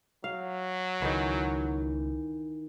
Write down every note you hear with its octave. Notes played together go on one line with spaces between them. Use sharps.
F#3 F5
C#2 D#3 E3